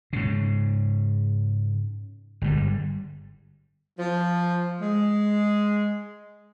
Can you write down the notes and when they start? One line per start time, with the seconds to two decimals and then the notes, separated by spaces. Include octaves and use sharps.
0.13 G#2 C#3
2.42 G1 G#2 G3
3.97 F3
4.80 G#3